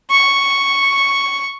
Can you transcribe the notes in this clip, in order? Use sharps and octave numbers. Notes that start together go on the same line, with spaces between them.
C#6